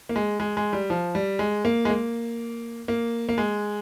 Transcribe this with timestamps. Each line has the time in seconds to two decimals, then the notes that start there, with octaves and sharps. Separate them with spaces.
0.09 A#3
0.16 G#3
0.40 G#3
0.57 G#3
0.73 G3
0.90 F3
1.15 G3
1.39 G#3
1.65 A#3
1.85 G#3
1.89 A#3
2.88 A#3
3.29 A#3
3.38 G#3